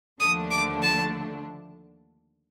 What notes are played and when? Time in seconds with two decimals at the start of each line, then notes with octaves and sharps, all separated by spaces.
0.20 D#2 D3 F3 A3 D4 D#6
0.51 D6
0.82 A5